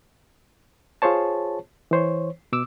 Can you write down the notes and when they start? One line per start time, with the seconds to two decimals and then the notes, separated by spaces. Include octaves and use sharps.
1.02 F4 G#4 C5 C#5 A5
1.91 E3 C5 C#5
2.52 B2 D6 E6